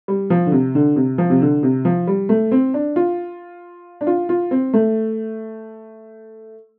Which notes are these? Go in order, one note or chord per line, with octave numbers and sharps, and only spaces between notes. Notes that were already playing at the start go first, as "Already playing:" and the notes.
G3
F3
D3
C3
D3
C3
F3
C3
D3
C3
F3
G3
A3
C4
D4
F4
D4
F4
F4
C4
A3